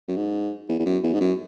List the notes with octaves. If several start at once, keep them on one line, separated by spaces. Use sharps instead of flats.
F#2
G#2
E2
E2
F#2
E2
G#2
F#2